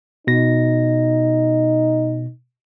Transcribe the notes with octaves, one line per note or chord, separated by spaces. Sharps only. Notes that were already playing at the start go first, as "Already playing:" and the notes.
B2 D#4 A#6